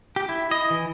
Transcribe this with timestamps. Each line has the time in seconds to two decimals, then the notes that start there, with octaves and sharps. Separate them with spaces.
0.16 G4
0.29 E4
0.51 D#5
0.70 E3